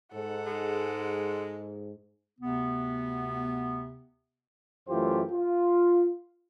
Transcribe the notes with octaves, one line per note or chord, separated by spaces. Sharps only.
G#2 A4 F#5
G#3
D2 C3 B3
F#2 E3 A3 F4 G4 C5
F4